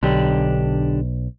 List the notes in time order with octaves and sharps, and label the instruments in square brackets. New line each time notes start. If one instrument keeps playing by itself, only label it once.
[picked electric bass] B1 [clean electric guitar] D3 D4 G4